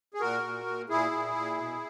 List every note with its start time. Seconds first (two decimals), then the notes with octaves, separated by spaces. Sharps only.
0.14 G#4
0.20 A#2 F#4 A#4
0.43 A#2
0.66 A#2
0.89 A#2 E4 G#4
1.11 A#2
1.35 A#2
1.57 B2